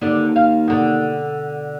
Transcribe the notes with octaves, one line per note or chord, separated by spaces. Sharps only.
D#2 D3 D5
F5
B2 D3